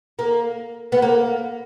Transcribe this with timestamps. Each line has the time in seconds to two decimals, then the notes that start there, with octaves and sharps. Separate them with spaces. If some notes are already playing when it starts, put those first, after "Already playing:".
0.19 A#3
0.92 B3
1.02 A#3